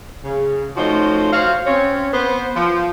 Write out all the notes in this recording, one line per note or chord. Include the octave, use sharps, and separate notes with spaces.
C#3
F3 A3 C#4 D#4 F#4 C5
F#4 C5 C#5 F5
C4 C#4 C#5
B3 C5
F3